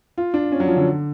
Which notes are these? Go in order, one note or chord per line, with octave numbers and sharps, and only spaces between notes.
F4
D4
C#4
F#3
F3
D3